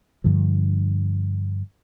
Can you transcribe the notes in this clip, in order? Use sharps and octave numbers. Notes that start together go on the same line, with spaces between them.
G2 D3 F3